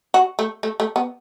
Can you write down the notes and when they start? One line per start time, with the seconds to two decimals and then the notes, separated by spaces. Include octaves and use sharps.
0.14 F#4
0.39 A3
0.63 A3
0.80 A3
0.96 B3